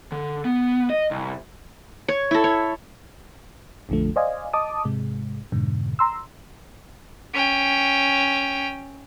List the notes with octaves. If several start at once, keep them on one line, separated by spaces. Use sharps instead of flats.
D3
B3
D#5
C2
C#5
E4 A4
C#5
A#1 F2 D3 F3 A3
C5 D5 D#5 F5 G#5
D#5 A5 D6 D#6
G#2 C3 G#3
F2 G#2 B2 D3
A#5 C6 E6
C#4 G5